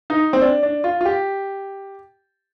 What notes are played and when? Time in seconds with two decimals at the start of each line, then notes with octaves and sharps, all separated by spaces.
0.10 D#4
0.33 C4
0.42 D4
0.63 D4
0.84 F4
1.01 F4
1.05 G4